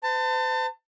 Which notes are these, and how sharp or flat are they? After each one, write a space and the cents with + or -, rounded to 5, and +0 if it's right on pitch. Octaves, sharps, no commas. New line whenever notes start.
C5 -45 A5 +30